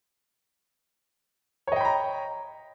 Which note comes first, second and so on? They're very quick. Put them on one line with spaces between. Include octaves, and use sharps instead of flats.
C#5 D#5 G5 B5 A#5